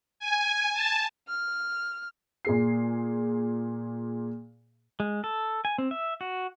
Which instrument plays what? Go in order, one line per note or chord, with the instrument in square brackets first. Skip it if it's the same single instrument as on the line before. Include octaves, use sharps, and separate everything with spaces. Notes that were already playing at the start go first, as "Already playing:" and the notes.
[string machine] G#5
A5
[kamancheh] F6
[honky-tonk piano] A#2 G#4 C7
[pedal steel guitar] G#3
A4
G#5
C4
E5
F#4